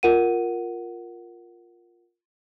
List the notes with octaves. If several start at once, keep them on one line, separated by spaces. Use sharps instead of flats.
F4 A#4 F#5 D#7